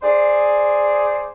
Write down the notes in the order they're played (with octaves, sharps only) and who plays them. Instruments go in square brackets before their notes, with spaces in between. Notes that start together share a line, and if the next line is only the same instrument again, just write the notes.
[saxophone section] G#4 C5 D5